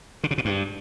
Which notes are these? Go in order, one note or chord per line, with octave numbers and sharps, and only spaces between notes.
D3
C#3
B2
G2